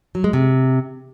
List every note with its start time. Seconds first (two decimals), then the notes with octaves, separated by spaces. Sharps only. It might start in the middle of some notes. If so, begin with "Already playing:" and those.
0.15 F#3
0.24 G#3
0.33 C3